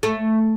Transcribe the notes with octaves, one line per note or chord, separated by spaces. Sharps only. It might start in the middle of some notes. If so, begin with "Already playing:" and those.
A3